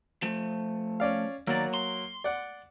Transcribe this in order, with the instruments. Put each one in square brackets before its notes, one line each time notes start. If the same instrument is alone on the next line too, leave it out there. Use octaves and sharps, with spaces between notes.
[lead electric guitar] F3 A3
[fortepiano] C#4 D5 F5
[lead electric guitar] D#2 D5 [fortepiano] F#3 A#3
[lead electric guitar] C6
[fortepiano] D5 F#5